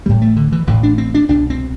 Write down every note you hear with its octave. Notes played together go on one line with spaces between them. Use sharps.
A1 A2 G3
A3
D3
E3
A1 A2 E3
D4
C4
D4
C2 B2 D4
C4